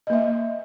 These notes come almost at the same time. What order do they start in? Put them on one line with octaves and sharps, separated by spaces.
D#5 A#3 E5